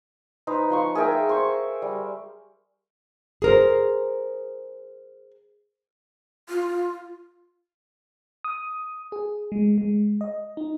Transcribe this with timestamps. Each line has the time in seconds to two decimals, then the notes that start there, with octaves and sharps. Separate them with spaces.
0.47 D#4 B4 C5
0.70 F3 C6 C#6
0.95 G#4 A#4 E5 G5
1.29 C5 C#6
1.82 G3
3.42 G#4 A#4 C5
6.49 F4
8.44 D#6
9.12 G#4
9.52 G#3
9.78 G#3
10.21 D#5
10.57 D#4